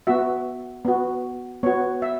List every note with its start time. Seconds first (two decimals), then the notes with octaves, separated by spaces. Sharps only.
0.07 B3 F#4 E5
0.85 B3 F#4
1.63 B3 F#4 C#5
2.02 E5